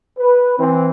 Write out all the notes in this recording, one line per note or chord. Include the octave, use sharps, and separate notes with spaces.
B4
E3 C4